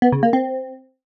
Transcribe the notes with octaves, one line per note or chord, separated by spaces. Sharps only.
B3
C#3
A#3
C4